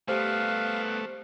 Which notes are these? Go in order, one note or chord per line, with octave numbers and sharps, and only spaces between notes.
G3 A3 B3 G4 C5 F5